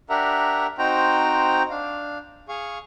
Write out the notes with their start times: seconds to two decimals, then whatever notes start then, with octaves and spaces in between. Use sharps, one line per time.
0.10 D4 G4 A#4 E5 F#5 A#5
0.78 C4 D#4 F#4 C5 G5 A#5
1.70 D4 F5
2.48 G#4 F5 C#6